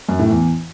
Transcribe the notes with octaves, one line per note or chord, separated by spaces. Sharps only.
F#2
A2
E2